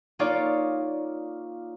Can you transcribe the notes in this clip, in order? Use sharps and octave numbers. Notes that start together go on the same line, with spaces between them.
A#3 D#4 F4 C#5 D5